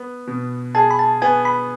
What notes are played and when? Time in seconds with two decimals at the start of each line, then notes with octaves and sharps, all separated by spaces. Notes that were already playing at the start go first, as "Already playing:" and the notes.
Already playing: B3
0.27 B2
0.75 G#4 A5
0.91 B5
0.99 A5
1.22 B3 G#5
1.45 B5